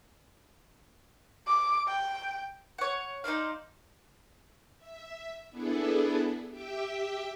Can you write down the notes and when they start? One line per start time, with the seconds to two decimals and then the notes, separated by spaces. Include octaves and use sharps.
1.47 D6
1.87 G5
2.78 C#5 F#5
3.24 D#4 C5 D5 F5
4.78 E5
5.50 B3 D4 E4 G#4 A4
6.49 G4 E5 G5